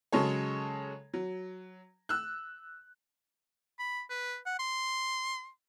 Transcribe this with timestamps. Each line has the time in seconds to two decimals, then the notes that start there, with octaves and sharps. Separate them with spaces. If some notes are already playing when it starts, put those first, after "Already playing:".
0.12 C#3 F#3 G#3 A4 C#5
1.14 F#3
2.09 E6 F#6
3.79 B5
4.10 B4
4.46 F#5
4.59 C6